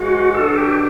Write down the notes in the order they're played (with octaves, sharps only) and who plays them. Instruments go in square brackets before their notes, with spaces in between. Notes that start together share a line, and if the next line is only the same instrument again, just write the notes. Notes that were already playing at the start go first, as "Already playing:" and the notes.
Already playing: [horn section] F#2 C#3 E3 G#3 [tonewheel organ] F#4
[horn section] D3 F#3 B3 D4 F#4 [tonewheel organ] A4
[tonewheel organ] G4